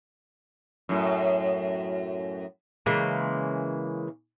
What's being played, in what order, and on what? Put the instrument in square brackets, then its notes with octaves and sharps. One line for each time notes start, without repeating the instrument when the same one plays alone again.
[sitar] F#2 A2
[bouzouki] C#3 E3 G#3 A#3